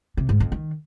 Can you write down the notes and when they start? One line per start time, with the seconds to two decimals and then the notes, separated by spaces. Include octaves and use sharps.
0.17 C3
0.29 G#2
0.40 F2
0.52 D#3